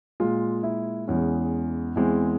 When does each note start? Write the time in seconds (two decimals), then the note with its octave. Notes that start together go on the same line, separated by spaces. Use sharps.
0.20 A#2 G#3 F4
0.63 E4
1.08 E2 E3 G#3 C#4
1.96 E2 E3 G#3 C4